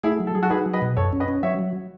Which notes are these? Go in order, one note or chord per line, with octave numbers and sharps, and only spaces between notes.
A3 E4 G#4
F#3
A4
F#3 G#4
F#4 A4
D#4 G#4 B4
F#3
B4 D#5
B2
F#2 A4 C#5
C#4
B4 D#5
C#4
F#3 C#5 E5
F#3